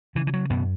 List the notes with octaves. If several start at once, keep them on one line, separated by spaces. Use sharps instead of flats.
C#3 E3
E3
F#3
F#2 B2 B3